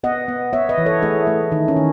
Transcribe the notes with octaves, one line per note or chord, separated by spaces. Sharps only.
B3 D#5 F#5
B3
B3 C#5 E5
B4 D#5
E3
A4 C#5
A3 E4 G#4
A3
D#3 D#4
C#4
D#3